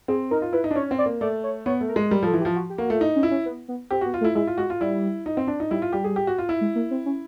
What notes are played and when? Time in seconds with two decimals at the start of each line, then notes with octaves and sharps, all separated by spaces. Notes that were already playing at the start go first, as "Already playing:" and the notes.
0.08 C4 G#4
0.31 D#4 A#4
0.42 F4
0.53 E4 B4
0.64 D#4
0.71 D4
0.76 C#4 C#5
0.91 C4
0.98 D5
1.06 A#3
1.21 A3 D5
1.44 C#5
1.66 B3 C#5
1.81 A3
1.88 A#4
1.96 G#3
2.11 G3 A#4
2.23 F3 A4
2.34 E3
2.41 G4
2.45 F3
2.55 F#4
2.70 G4
2.78 A#3 F#4
2.90 A3 F4
3.00 D#4 E4
3.16 C#4
3.23 E4
3.31 C#4
3.46 B3
3.68 B3
3.91 C4 G4
4.01 B3 F#4
4.14 F4
4.21 A3
4.24 E4
4.35 G#3 E4
4.47 F4
4.58 G#3 F#4
4.70 F4
4.81 G3 E4
5.26 D#4
5.37 C4
5.48 D4
5.60 D#4
5.71 G3 E4
5.82 F4
5.93 G3 G4
6.04 G#4
6.16 G4
6.27 F#4
6.38 F4
6.49 E4
6.61 G#3
6.75 A#3
6.91 C4
7.06 C#4